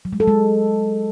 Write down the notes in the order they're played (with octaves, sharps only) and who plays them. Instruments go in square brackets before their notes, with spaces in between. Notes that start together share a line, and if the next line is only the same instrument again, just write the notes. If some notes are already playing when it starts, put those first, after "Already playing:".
[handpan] F#3
G#3
A4
G#3